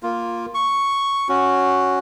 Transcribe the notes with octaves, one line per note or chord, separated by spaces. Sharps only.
A#3 F4
C#6
C#4 F#4